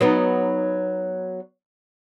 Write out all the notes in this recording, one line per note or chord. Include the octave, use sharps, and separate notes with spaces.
F#3 B3 D#4